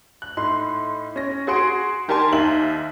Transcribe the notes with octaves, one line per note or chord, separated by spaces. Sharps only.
F#6
A2 D#4 C6
C#4 A#6
F#4 G#4 C6 C#7 D7
D#3 G4 A#4 G#5 A5 C6
D#2 D#3 D#4 E5 F#7